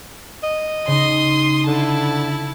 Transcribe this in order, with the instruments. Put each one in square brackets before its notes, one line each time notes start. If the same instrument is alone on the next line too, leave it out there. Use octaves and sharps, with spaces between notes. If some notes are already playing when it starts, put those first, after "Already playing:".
[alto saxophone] D#5
[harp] C#3 D#4 [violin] C6 D#6
[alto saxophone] D3 [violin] E4 A5